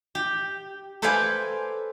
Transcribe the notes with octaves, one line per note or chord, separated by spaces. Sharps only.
G4
A4 B4 C5 D5 F5 G#5